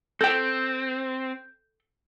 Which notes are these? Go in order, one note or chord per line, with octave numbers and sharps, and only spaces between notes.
C4 A4 G5 G6